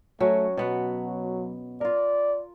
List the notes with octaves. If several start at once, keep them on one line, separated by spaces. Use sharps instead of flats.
F#3 A3 C#4 F#4
B2 F#3 B3 F#4
F4 A#4 D5